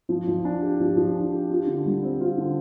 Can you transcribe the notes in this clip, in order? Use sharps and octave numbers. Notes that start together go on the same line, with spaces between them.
F3
F3
D4
G4
F3
F3
D4
G4
F4
D3
G3
C4
F4
D3